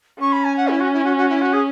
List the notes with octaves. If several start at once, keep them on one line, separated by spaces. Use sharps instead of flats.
C#4 C#6
B5
G#5
F#5
E4
F#4
E4
F#4
F#4
E4
F#4
G#4